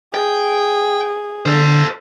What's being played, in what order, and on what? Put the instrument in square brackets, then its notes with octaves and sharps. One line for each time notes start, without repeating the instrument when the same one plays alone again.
[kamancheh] G#4 [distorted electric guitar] G5
[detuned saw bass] D3 [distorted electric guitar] A4 C5